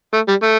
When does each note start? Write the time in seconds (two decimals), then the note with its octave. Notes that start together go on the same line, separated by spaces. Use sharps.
0.14 A3
0.28 G3
0.43 A3